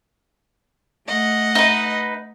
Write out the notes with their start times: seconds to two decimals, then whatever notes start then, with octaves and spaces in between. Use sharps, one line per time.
1.07 A3 D#5 F#5
1.55 D#4 B4